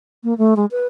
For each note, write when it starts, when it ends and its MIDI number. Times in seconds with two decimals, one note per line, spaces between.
0.24 0.37 58
0.38 0.54 57
0.56 0.65 56
0.71 0.87 71